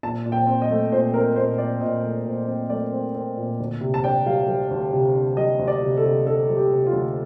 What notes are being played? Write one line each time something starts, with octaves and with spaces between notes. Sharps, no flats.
A#2 A5
A#2
G5
C4
D#5
A3
A#2 C5
C4 A#4
A#2 C5
A#2 D5
A#2 D#5
A3
A#2
C4
A3 D5
C4
C4
A#2
D2
C3
A5
D4 G5
G3 F5
G3
D2
C3
D4
G3 D#5
D2
D5
C3
A4
C3
D4 A4
G3
G4
C3
F4
D2